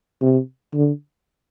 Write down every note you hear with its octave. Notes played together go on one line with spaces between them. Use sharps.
C3
D3